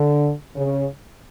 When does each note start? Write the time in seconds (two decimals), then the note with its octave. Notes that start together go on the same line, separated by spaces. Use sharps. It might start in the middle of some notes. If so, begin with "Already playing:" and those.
Already playing: D3
0.56 C#3